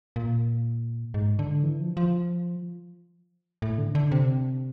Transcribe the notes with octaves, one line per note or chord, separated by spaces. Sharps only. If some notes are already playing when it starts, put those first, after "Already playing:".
A#2
G#2
D3
E3
F3
F3
A2
D3
D3
C3